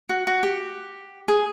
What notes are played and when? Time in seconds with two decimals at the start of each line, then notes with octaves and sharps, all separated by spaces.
0.09 F#4
0.27 F#4
0.43 G4
1.28 G#4